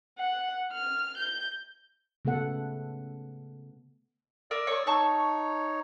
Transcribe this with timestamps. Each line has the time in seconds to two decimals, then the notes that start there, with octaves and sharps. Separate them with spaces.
0.18 F#5
0.73 F6
1.17 G6
2.25 C#3 A3 B3 A4 F#5
4.51 A#4 D5 D#6 E6
4.67 C#5 C#6
4.87 D#4 C#5 A5 C#6 E6